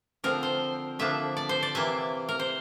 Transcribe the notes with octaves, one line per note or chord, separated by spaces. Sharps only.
D3 F3 C4 A#4
C5
D3 F3 A#3 D4 E5
D5
C5
D5
C3 E3 A#3 E5
A#4
C5